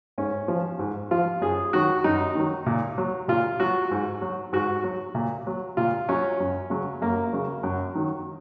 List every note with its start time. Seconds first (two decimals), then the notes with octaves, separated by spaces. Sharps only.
0.18 G#2 C#4
0.48 F3
0.79 G#2
1.11 F3 F4
1.41 F#2 G#4
1.73 D#3 F#3 F#4
2.04 F#2 D#4
2.35 D#3 F#3
2.66 A#2
2.98 F#3
3.28 A#2 F4
3.60 F#3 F#4
3.91 G#2
4.22 F#3
4.53 G#2 F#4
4.84 F#3
5.15 A#2
5.47 F#3
5.77 A#2 F4
6.09 F#3 C#4
6.40 F#2
6.70 C#3 F#3
7.01 F#2 A#3
7.33 C#3 F#3
7.63 F#2
7.95 D#3 F#3